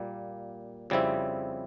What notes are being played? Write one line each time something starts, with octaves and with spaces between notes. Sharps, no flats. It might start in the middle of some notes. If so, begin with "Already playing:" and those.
Already playing: A#2 G3 A#3
F2 C#3 G3 C4 E4